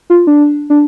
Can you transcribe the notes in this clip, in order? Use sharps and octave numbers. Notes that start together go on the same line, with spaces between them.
F4
D4
D4